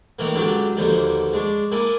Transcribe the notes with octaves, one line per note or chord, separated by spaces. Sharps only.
A2 D#3 E3 A#3
C#2 D3 F#3 D4 G4 C#6
D#2 B2 D3 F3 A#3
G#3 D4 C#6
A#3 D4 E4 G#5